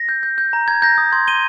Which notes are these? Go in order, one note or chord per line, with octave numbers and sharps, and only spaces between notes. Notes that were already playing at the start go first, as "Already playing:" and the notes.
Already playing: A#6
G6
G6
G6
A#5
A#5 G#6
A#5 G6 A#6
D#6 G6
C6 G#6
C6 D#7 G7